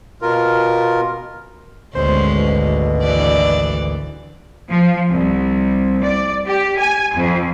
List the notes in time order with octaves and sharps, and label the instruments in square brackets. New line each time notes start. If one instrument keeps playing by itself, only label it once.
[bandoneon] B2 F4 A#4
[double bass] G#1 D2 [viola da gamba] G#3 B3 C#4 [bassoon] C5
[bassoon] B2
[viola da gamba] E3 D4 D5
[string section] F3
C2
D5
G4
G#5
F2